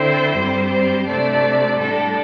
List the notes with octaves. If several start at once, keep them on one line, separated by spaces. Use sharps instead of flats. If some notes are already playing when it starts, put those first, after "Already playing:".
Already playing: D3 C4 E4 C5
G2 G3 C4
C5
C3 A3 D4 D5
A2 G3 D4 A4